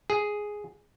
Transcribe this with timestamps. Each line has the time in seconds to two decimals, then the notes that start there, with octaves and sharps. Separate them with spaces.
0.10 G#4